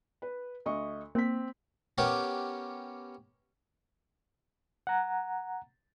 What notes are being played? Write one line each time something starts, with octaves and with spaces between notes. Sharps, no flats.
B4
D2 D#5 C#6
A#3 C4 B6
B3 C#4 G4 A#4
F#5 A#5